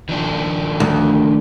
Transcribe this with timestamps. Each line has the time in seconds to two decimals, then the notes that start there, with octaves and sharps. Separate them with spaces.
0.09 D#3 F3 D4
0.80 D2